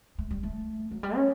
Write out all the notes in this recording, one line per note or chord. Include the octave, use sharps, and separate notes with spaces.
A3
G3
A3
F#3
G3
C#4